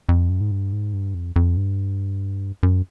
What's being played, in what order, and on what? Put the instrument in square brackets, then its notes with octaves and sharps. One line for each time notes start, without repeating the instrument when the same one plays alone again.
[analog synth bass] F2
F#2
G#2
G2
G#2
G2
F2
F2
G2
F#2